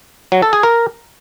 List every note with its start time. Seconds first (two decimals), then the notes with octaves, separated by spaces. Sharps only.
0.32 F#3
0.42 A4
0.53 G#4
0.63 A#4